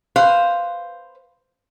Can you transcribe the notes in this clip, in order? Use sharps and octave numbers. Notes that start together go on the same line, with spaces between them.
B4 C5 F5